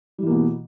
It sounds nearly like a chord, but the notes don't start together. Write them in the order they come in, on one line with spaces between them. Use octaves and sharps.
G3 E3 A#3 B2